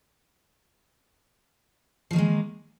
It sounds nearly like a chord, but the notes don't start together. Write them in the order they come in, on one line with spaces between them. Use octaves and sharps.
F3 D#3 A#3 G#3